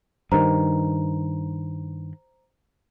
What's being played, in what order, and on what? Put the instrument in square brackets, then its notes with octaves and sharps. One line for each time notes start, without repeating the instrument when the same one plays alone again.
[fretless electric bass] G2 D#3 [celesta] C5 A#5